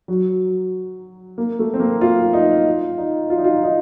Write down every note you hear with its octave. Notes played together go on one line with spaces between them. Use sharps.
F#3
A#3
A3
C4
A#3
F4
D#4
F4
D#4
F4
D#4
F4
D#4